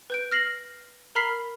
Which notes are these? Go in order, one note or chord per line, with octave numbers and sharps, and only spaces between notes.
B4 G6 D7
F6 A#6 C7 F#7
A#4 A#5 B5 F6 B6 C7